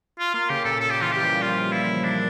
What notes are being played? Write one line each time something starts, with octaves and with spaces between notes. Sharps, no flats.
F4
A#3 F4
C#3 G4
A#2 A4
C#3 A4
G4
E3 F4
G3 G4
F3
F4
E4
D4